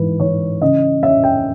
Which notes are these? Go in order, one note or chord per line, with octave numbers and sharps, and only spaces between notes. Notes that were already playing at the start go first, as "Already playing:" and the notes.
Already playing: G#2 E3 B4
E3 C#5
C#3 D#5
C#4 E5
G5